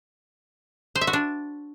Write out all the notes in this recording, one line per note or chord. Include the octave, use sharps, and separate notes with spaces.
C5
E5
F#4
D4